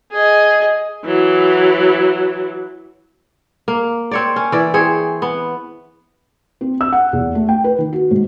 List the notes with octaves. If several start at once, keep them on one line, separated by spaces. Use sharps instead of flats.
G#4 D#5
E3 F#3
A#3
C4 C#5 D5
C#4
E3 D5
C4 G#4 C#5
B3
C4
E6
F#5
E2
A3
G5
B4
D#3
F#4
G#2